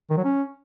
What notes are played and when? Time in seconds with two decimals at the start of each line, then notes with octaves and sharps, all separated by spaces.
0.10 D#3
0.17 F#3
0.24 C#4